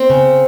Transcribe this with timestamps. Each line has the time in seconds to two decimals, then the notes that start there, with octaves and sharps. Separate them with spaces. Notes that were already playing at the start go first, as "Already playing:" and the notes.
Already playing: C4
0.10 C#3